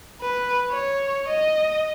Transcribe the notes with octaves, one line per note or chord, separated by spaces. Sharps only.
B4
C#5
D#5